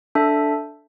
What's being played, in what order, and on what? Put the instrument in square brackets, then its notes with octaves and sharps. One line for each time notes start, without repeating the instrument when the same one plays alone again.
[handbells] D4 A4 E5